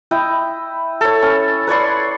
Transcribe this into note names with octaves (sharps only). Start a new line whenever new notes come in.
E4 D#5 G5
A4 C#5
C#4
B4 C#5 D5 C6